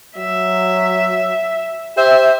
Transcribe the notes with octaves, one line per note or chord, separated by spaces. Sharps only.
F#3 E5
G4 C5 E5